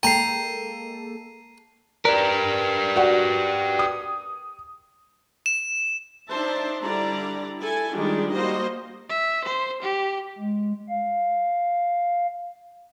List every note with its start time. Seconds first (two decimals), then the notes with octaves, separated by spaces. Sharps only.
0.03 G#3 A#3 A4 G5 A5 A#5 C7 D#7
2.05 G4 A#4 B4 D5
2.96 F#4 D5 F#5
3.79 D#6
5.46 E7
6.29 D4 D#4 C5 E5 A5
6.83 D3 G3 E4 D5 A#5
7.58 E4 A4 G#5
7.93 D#3 F3 G3 G#3 D4 D#4
8.33 G3 A#3 F#4 G4 C5 D#5
9.09 E5
9.44 C5
9.82 G4
10.38 G#3
10.88 F5